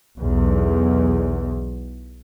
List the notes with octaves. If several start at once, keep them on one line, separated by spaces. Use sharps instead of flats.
B1 E2